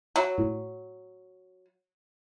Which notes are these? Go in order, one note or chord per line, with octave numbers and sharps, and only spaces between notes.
F#3
A2